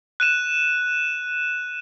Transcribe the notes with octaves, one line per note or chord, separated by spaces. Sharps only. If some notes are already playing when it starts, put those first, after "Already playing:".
F#6 D#7 E7